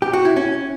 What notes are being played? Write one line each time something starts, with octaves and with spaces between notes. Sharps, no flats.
G4
F#4
E4
C#4